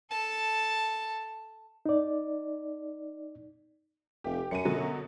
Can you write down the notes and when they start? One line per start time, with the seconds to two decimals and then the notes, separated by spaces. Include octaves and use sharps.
0.11 A4 A5
1.86 D#4 D5
4.24 F1 G4
4.51 F#2 C#7 D#7
4.65 B2 D3 F#3